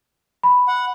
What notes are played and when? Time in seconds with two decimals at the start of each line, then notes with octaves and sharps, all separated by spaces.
0.43 B5
0.68 F#5